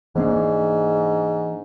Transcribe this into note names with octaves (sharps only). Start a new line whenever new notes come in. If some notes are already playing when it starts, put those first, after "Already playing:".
G#2 E3 A#3 D4